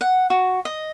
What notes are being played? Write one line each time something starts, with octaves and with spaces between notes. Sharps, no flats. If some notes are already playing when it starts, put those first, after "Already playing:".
F#5
F#4
D#5